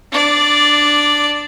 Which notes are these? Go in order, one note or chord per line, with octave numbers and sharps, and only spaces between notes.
D4 D5